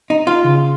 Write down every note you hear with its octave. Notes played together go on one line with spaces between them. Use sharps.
D#4
F4
C#3